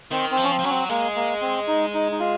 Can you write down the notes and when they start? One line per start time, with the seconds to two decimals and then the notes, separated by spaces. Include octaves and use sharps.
0.11 D#3 C4
0.31 C4
0.37 F3
0.44 C#4
0.51 C4
0.59 F3
0.64 F#3 C#4
0.70 C4
0.89 G#3 A#3
1.16 A#3
1.41 C4
1.68 D#4
1.94 D#4
2.12 D#4
2.20 F4